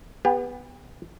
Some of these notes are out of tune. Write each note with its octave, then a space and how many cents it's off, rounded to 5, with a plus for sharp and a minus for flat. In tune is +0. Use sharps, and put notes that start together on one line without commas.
B3 +0 G4 +40